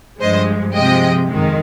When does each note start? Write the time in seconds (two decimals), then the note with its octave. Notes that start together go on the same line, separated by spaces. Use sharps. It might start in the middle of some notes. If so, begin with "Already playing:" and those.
0.21 G2 F3 G#3 C5 D#5
0.75 C3 F3 G#3 D#5 G5
1.28 F2 D#3 G#3